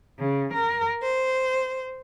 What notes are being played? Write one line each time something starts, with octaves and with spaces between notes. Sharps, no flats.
C#3
A#4
C5